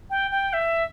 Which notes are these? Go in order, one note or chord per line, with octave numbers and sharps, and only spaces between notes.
G5
G5
E5